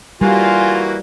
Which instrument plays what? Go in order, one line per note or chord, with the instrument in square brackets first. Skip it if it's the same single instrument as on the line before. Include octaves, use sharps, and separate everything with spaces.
[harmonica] E3 A#3 F#4 [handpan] G3 [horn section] F4 [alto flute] G#5